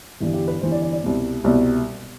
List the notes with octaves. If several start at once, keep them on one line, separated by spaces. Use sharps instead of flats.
G1 G2 E3 E4
G4
B4
G1 G2 E3 C5
D5
D5
D5
C2 B2
C2 B2